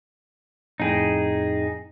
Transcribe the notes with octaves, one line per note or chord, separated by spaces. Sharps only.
F2 A2 D#4 G#4 G5